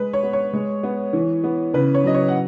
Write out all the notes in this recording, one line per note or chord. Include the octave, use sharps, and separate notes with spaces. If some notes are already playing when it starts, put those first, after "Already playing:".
Already playing: G#3 B4
C#5
B3
C#5
G#3
B3
E3
B3
C#3 B4
C#5
F#3 D#5
C#5
F#5